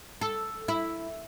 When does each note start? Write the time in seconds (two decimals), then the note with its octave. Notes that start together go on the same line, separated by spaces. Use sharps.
0.21 A4
0.68 E4